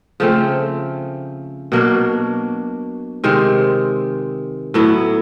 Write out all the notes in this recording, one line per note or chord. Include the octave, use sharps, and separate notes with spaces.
C#3 F3 A3 C4
B2 F#3 A#3 D4
C3 D#3 G#3 C4
A2 F#3 B3 E4